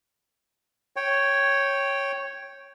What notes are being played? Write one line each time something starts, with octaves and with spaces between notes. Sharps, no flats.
C#5 G5